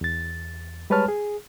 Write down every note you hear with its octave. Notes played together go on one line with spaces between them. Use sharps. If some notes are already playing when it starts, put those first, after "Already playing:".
E2 A6
G3 G#3 B4 C#5 A5 F6
G#4